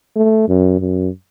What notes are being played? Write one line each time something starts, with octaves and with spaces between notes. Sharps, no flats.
A3
F#2
F#2